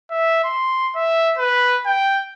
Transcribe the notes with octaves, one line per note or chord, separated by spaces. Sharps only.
E5
C6
E5
B4
G5